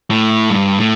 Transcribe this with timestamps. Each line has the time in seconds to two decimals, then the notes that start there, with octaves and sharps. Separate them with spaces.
0.10 A2
0.50 G2
0.78 A2